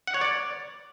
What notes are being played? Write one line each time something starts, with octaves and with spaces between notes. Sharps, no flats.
F#5
C#5
D5